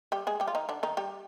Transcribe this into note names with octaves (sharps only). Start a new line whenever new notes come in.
G3 G4
G#3 G#4
G3 G4
F4
D#3 D#4
D3 D4
D#3 D#4
G3 G4